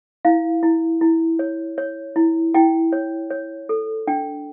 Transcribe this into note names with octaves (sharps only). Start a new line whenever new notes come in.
E4 F5
E4
E4
C#5
C#5
E4
E4 G5
C#5
C#5
A4
D4 G5